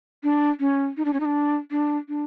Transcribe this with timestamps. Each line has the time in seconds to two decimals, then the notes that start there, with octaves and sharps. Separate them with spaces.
0.23 D4
0.60 C#4
0.97 D#4
1.05 D4
1.13 C#4
1.20 D#4
1.25 D4
1.71 D4
2.09 D4